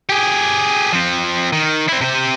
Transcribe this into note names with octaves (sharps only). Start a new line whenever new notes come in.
G4 G#4
F3 C4
D#3
C4 E4
C3 C5